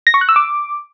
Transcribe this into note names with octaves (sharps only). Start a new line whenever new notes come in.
A#6
C#6
F#6
E6
D6